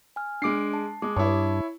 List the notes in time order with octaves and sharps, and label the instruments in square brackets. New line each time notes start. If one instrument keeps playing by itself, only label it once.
[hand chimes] G#5 F6
[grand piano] G#3 D6 C7 [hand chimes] D4 D7
[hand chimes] A5
[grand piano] G#3 [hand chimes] D6 D#6
[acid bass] G2 [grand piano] E4 C#5 [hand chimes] A5